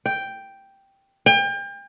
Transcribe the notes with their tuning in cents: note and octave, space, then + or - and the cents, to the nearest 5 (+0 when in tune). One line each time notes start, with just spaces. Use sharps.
G5 +0
G5 +35